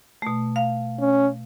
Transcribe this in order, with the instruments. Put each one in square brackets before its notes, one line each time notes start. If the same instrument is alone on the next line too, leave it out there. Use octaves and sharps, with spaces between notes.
[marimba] B2 A3
F5
[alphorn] C#4